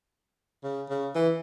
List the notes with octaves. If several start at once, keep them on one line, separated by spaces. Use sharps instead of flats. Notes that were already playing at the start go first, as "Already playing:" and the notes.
C#3
C#3
E3